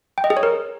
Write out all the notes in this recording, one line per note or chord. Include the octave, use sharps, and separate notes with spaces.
G5
D#5
G#4
C#5
A#4